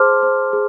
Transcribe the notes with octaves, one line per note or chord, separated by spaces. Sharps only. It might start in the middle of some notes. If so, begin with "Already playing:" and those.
Already playing: G#4 C5 A5 C6 D6 F6
C5
G#4